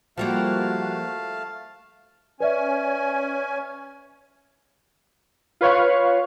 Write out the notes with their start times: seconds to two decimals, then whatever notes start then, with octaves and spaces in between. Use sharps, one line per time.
0.18 F3 G3 A3 A#3 F#4 F5 A5
2.40 C#4 B4 D5 E5 G#5
5.61 F4 B4 C#5 F5 C#6